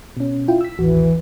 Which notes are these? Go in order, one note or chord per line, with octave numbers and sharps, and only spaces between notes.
B2 C#4
E4 F4 G5
E6 B6
A1 D#2 E3 F#4